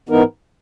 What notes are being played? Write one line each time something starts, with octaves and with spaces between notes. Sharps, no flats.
G#2 E3 B3 D#4 A#4